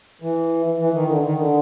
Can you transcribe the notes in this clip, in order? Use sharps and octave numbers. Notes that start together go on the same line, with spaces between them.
E3
E3
D#3
D3
D#3
D3